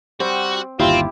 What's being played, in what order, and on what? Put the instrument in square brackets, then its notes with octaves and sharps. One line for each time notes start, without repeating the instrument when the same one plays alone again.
[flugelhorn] G3 [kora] C4 C5 [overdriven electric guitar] F#4
[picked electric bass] G1 D#2 [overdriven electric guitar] C4 [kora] E4 G4 [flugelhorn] F4